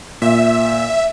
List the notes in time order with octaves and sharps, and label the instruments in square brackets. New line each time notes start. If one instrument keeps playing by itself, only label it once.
[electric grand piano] A#2 [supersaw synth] E5